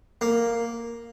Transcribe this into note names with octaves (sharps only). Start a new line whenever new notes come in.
A#3